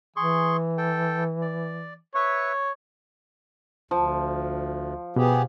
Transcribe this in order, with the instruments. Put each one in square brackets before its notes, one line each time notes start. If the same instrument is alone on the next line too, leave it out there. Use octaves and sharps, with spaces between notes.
[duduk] E3 [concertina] G#4 C6 C#6
[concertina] A4 G5
D5
[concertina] B4 E5 C#6 [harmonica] C#5
[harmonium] D2 [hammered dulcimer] F3
[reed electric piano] B2 [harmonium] B3 G4 G#4